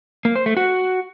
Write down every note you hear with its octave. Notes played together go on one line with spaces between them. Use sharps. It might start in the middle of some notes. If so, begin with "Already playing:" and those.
A#3
C5
A3
F#4